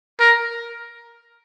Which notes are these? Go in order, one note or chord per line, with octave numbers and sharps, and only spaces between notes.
A#4